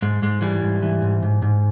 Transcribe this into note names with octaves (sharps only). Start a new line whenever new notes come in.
G#2 G#3
G#2 G#3
E3 G3
G#2
E3
G#2
G#2
G#2